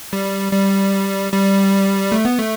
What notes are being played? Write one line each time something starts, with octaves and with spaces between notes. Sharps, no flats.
G3
G3
G3
A3
B3
A3